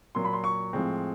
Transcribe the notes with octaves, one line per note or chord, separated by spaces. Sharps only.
A#2 F#3 A#3 C6
B5
C6
C#6
A2 F3 G#3 C4